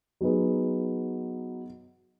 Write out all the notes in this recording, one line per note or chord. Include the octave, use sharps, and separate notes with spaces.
F#3 B3 D#4 G#4 B4